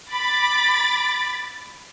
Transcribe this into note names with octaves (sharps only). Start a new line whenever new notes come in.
B5 D6 A6